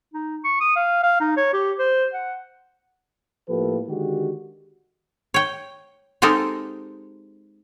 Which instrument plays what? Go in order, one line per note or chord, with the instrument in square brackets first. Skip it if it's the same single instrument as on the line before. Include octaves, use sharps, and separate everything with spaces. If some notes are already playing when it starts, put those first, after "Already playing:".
[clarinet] D#4
C#6
D#6
F5
F5
D#4
C#5
G4
C5
F#5
[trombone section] A2 F3 A#3 G4 A4 B4
D3 D#3 G#3 F#4 G4
[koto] C#5 G5
G#3 C4 D#4 G4 A4 A#4